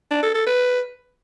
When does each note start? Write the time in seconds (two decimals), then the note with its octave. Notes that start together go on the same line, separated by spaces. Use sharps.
0.11 D4
0.23 A4
0.35 A4
0.47 B4